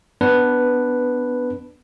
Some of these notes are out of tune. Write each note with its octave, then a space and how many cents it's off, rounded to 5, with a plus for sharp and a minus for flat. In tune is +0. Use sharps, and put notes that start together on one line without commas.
B3 +10 D4 +0 B4 +0